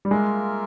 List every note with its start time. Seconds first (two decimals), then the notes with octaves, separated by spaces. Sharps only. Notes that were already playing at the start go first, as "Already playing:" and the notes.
0.05 G3
0.11 G#3 A#3 F4 A#4 E5